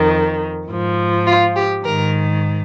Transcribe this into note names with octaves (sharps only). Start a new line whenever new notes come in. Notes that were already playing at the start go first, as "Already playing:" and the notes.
Already playing: F2 D#3
G#2 F3
F4
G4
G#2 D#3 A#4